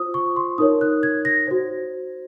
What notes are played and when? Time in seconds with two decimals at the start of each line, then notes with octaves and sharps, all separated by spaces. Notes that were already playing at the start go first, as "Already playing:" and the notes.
Already playing: F4 C5 D#6
0.14 C#6
0.36 C6
0.58 D#4 A#4 C#5 D#6
0.81 F#6
1.03 G#6
1.25 A#6
1.47 F#4 C5